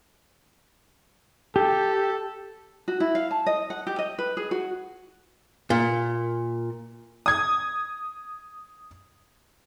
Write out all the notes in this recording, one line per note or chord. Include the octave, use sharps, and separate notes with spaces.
G4 A4
F#4
E4
F5
A5
D#5
F#5
G4
D#5
B4
G#4
F#4
A#2
D#6 G#6